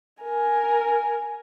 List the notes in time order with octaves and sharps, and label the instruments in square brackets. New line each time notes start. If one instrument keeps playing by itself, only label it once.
[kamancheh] A#4 G#5